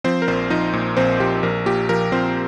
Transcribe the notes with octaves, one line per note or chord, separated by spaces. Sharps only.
F3 C4 C5
A#4
A#1 C4 C5
F3 D#4 D#5
A#2
A#1 C4 C5
F3 G4
A#1 A#4
A#2 G4
F3 A#4
F3 C4 C5